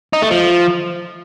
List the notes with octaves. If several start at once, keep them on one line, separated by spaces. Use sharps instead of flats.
D#4
A3
F3